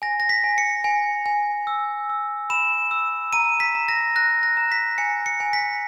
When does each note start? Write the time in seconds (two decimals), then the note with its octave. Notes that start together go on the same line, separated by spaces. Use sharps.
0.02 G#5 A#6
0.20 A#6
0.29 B6
0.44 G#5
0.58 C#7
0.84 G#5
1.26 G#5
1.67 E6
2.10 E6
2.50 B5 E7
2.91 E6
3.33 A#5 D#7
3.60 B6
3.75 A#5
3.88 A#6
4.16 F#6 A#6
4.43 A#6
4.57 A#5
4.72 B6
4.98 G#5 C#7
5.26 C#7
5.40 G#5
5.53 B6